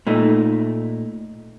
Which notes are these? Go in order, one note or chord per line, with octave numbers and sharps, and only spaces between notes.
A#2 A3 D#4